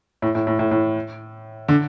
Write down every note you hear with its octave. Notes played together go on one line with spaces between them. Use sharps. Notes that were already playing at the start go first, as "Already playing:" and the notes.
A2
A2
A2
A2
A2
D3